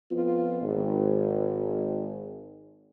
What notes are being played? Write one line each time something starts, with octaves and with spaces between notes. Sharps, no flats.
F2 B3 F4
G#1